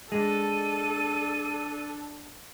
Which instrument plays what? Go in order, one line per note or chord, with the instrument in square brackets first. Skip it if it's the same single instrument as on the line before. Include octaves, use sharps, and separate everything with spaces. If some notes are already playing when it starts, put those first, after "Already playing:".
[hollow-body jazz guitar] G#3 [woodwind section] D4 [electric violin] A4 [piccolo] D#7